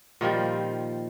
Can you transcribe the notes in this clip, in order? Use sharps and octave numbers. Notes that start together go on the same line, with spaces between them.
A#2 D#3 F3 G3